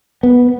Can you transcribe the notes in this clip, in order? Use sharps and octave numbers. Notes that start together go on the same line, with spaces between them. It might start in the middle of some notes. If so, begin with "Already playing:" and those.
B3